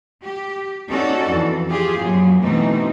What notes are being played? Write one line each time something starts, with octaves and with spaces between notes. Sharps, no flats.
G4
C#4 D#4 F#4 A4 D5
F2 E3
F4 G4 G#4
F#2 A#2 F3 F#3
B2 E3 A3 C4 D#4